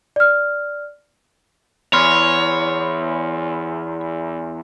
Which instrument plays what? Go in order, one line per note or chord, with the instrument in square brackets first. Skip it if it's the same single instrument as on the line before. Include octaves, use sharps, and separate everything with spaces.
[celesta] D5 F6
[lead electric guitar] E2 [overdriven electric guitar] C#5 [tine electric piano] B5 C6 F6